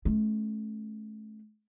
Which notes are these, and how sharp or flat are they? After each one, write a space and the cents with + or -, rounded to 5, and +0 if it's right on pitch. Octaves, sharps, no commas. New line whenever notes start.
A3 -35 C#4 -20